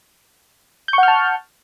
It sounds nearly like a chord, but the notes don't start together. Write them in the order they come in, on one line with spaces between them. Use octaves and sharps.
G6 C#6 F#5 F6 A5